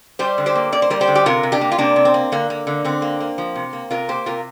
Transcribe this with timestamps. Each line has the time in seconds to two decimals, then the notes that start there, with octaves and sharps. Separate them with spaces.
0.19 G3 G4 C5
0.38 D3
0.46 G4 C5
0.55 A#3
0.72 A#3 D5
0.82 C5
0.90 G3 A#4
1.01 G4 C5
1.08 D3
1.15 G4
1.26 C3 F4 A#4
1.43 C3
1.52 D4 G4
1.61 A#3
1.72 F4
1.78 C3 A#3 D4
1.96 C3
2.05 C4
2.14 A#3
2.32 D3 A#3
2.50 A#3
2.67 D3
2.85 D3 C4
3.02 A#3
3.20 A#3
3.38 F3
3.55 C3
3.73 A#3
3.91 C3 F4 A#4
4.09 A#3 G4 C5
4.26 C3 F4 A#4